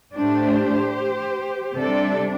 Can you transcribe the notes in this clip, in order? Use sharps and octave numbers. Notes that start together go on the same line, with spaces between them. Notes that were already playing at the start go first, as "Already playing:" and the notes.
A2 A3 D4 G4 C5
C3 G3 D4 A4 D5